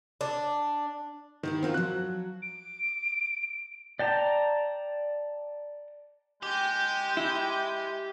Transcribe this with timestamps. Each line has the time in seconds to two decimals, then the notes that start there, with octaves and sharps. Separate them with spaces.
0.21 D4
1.43 D#3 E4 G4 C5
1.63 C4 C#4 F4 F#4 A#4
1.74 F3 F#3 F#6
2.41 D7
3.99 D5 G5 A5 A#5
6.43 G#3 G4 G5 G6
7.17 E4